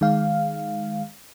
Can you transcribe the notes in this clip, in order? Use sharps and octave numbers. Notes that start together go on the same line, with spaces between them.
D#3 G#3 F5